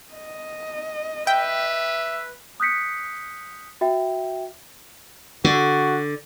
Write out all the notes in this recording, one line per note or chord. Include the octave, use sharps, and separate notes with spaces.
D#5
B4 E5 G5
D#6 F#6 G6 B6 C#7
F#4 E5 G5
D3 F#4